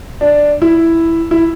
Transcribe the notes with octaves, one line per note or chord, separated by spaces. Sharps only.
D4
E4
E4